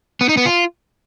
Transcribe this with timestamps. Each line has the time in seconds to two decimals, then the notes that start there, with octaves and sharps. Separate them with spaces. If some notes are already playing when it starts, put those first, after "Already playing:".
0.21 B3
0.29 D#4
0.37 B3
0.45 F4